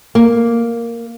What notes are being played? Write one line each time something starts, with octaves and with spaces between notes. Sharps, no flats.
A#3